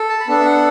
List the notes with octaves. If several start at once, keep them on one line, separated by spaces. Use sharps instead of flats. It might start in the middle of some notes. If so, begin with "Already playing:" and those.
Already playing: A4
A5
B5
B3 D4 A4 A5
E5
F#5